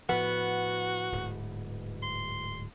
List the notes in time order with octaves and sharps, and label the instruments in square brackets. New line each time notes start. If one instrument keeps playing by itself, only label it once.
[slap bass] A2 F3 [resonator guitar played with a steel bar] B3 [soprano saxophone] F#4
[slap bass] D1 G#2
[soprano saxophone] C6